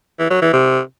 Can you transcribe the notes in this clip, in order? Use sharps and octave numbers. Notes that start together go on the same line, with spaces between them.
E3
F#3
E3
C3